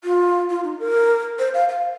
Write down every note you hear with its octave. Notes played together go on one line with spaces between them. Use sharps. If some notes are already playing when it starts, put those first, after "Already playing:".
F4
F4
D#4
A#4
C5
F5
F5